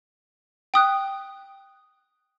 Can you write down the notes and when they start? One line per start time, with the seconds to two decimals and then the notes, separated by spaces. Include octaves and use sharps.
0.74 G5 D#6 F#6